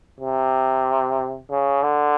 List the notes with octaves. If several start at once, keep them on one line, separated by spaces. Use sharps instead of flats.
C3
C#3
D3